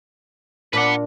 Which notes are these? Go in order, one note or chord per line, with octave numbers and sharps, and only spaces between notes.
A#2 D4 A#4 B4 F#5